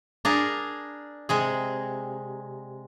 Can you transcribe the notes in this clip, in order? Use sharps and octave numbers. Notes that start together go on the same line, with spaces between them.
D4 G#4 A#4
C3 G#3 G#4